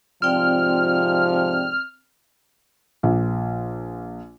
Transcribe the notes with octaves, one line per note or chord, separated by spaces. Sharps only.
G#2 C3 F3 C4 D5 G5 F6
A#1